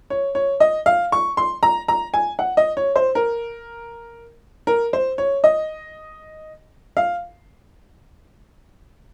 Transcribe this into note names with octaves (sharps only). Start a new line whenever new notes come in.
C#5
C#5
D#5
F5
C#6
C6
A#5
A#5
G#5
F#5
D#5
C#5
C5
A#4
A#4
C5
C#5
D#5
F5